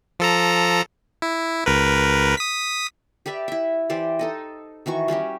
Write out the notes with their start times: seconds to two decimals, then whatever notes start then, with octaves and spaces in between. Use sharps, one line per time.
0.19 F3 A4 A#5
1.22 E4
1.66 C#2 A#4 B4
2.37 D#6 B6
3.26 G4 B4 D5 E5
3.48 E4 E5
3.90 E3 G4 C5 D5
4.19 D#4 A4 D#5
4.86 D#3 E3 F#4 C#6
5.08 G3 C#4 F#4 G4